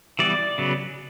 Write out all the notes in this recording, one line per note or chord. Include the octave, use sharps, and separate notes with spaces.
E3 G3 B3 D5
C#3 F#3 B3